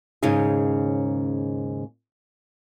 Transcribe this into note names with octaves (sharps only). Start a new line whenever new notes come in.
D#2 G#2 C#3 C#4 D#4 G#4